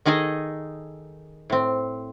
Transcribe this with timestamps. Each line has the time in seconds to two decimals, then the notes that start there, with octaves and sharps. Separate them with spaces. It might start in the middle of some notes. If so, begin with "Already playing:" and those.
0.05 D#3 D#4 G#4 A4 D#5
1.50 A2 C4